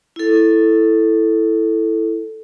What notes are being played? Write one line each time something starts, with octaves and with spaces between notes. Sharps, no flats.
E4 A4